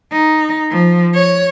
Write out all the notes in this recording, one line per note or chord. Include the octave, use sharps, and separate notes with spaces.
D#4
F3
C#5